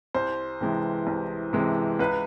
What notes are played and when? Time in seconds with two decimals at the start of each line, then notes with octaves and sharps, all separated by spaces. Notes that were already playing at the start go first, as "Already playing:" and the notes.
0.15 C2 C5
0.61 C3 E3 G#3
1.07 C2
1.53 C3 E3 G#3
1.99 C#2 B4